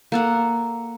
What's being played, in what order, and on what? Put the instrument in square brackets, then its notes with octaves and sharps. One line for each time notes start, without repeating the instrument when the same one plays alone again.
[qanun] A#3 A4 F#5